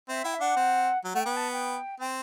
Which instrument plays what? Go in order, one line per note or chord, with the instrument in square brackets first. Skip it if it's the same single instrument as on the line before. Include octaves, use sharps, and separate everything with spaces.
[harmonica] C4 [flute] E5
[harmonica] E4 [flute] G5
[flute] E5
[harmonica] D4 [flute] F#5
[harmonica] C4
F#3
[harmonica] A3 [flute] F#5
[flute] G5
[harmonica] B3
[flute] A5
G5
[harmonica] C4 [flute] G5